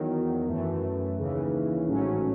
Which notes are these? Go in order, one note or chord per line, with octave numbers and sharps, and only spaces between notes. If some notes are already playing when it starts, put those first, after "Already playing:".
Already playing: E2 D#3 F#3
F#2 E3 A3
D#2 C#3 E3
A1 G#2 F#3 A3 C#4